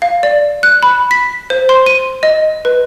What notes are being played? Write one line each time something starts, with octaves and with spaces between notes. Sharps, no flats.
F5
D5
F#6
B5
B6
C5
C6
D#7
D#5
B4